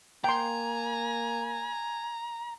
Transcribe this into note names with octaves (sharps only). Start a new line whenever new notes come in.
A#3 G5 G#5 A#5 C6